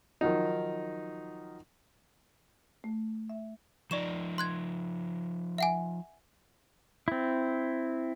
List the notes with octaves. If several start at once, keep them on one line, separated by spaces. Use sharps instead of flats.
D#3 F3 F#3 D#4
A3
E5
F3 D#4 D5 C#6 E7
C6 F#6 G#6
E5 F#5 G#5
C4 E4